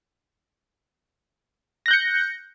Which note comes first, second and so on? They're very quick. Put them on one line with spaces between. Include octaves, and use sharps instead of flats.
A#6 F#6 G6 C#7